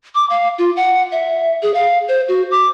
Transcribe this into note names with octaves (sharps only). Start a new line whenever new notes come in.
D6
F5
F4
F#5
E5
G#4
F5
C5
F#4
D6